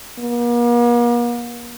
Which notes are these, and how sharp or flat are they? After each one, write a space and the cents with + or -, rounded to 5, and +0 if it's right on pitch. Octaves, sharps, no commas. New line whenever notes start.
A#3 +45